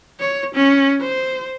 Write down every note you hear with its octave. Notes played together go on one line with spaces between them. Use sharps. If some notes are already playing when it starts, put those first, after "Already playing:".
C#5
C#4
C5